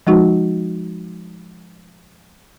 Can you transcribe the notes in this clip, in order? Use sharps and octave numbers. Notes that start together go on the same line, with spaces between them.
F3 G#3 D#4 F#4